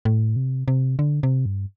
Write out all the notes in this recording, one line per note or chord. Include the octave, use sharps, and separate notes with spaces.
A2
C3
C3
D3
C3
G2